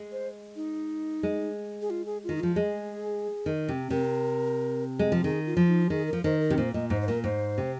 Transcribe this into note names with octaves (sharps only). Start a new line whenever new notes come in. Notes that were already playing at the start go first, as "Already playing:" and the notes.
Already playing: G#3
C5
D#4
G#3
G#4
F4
G#4
D#3 F4
D#4
F3 F4
G#3 G#4
D#3
C3
C3 A#4
G#3
F3
D#3 G#4
F4
F3
D#4
D#3 G#4
A#4
F3
D#3 C5
A#4
C3
A#2 C5
A#2 D#5
G#2 C5
C5
A#2 A#4
G#2 C5
C3